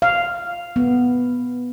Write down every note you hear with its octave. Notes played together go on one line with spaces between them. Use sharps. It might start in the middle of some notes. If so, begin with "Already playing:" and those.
F5
B3